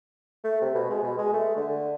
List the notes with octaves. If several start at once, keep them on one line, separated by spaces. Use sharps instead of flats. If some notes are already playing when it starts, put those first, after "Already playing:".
A3
C3
B2
G#3
B2
G#3
A3
D3